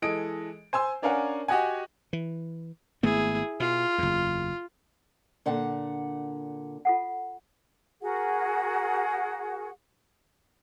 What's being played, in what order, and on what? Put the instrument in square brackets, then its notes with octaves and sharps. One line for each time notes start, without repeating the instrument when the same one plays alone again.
[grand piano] E3 G#3 A4 D#5 D7
C5 G#5 C6 E6
C#4 D4 A#4 F5 F#5 G#5
F#4 G4 D#5 F#5 G#5
[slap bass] E3
[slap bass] G#1 A3 B3 [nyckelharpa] E4 G#4
[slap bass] B2 [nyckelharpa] F4
[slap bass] F#1 E2
[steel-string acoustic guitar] A#2 D3 F#5
[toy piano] F4 A4 F#5
[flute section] F#4 G#4 A#4 F#5